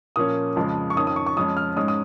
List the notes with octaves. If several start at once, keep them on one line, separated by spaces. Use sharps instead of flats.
A#2 F3 A#3 C#4 D#6
F2 C#3 F3 G#3
C#6
F2 D#3 C#4 D#6
D#6
C#6
C#6
F2 F3 G#3 C#4 D#6
F6
G#2 G#3 C#4 D#6
D#6